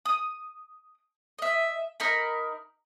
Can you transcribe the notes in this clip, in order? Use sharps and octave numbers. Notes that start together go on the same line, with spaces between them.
D#6
D#5 E5
D#4 A#4 B5